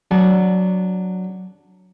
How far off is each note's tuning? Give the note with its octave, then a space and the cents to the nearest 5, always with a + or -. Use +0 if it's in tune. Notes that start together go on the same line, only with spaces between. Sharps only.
F#3 +0 D4 +0 A5 -35